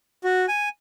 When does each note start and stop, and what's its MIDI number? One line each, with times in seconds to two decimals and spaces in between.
0.24 0.46 66
0.48 0.69 80